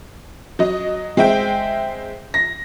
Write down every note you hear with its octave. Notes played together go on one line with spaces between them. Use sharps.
F#3 D#5
G#3 C4 E5 G5
A#6